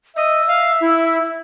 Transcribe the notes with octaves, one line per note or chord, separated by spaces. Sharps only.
D#5 E5
F5
E4